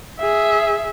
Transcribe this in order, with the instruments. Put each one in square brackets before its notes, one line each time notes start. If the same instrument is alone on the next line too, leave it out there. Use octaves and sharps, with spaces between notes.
[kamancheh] G#4 E5